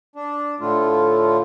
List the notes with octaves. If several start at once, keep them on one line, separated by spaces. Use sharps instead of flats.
D4
A2 D3 A3 F4